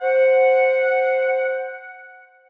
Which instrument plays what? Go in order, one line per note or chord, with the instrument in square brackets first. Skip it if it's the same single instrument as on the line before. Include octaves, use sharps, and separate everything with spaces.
[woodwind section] C5 F#5